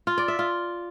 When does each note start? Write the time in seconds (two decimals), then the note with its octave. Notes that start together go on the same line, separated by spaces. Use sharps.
0.07 F4
0.18 D5
0.28 E5
0.39 F4